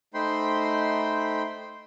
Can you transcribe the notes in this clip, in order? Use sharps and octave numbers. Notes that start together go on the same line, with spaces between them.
A3 D#4 C5 G5 B5 C6